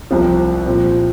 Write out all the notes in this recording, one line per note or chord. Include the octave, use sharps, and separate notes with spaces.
C2 C3 F3
A#2 F3 C4